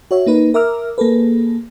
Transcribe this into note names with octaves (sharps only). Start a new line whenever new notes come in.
F#4 C#5 E5
A#3 D#4 B4
A#4 E5 A#5 D6 E6 F6
A#3 G#4 A4 B4